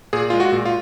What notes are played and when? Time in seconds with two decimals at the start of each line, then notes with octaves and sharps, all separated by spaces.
0.13 A#2 G#4
0.30 G#3 F4
0.40 F#4
0.52 A#2
0.65 F4